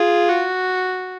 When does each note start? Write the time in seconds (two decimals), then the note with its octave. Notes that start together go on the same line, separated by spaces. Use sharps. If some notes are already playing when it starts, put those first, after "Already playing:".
Already playing: F4 G#4
0.29 F#4